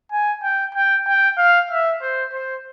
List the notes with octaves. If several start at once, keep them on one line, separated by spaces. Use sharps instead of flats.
G#5
G5
G5
G5
F5
E5
C5
C5